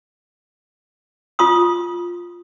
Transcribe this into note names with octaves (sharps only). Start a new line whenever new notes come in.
F4 C6 D#6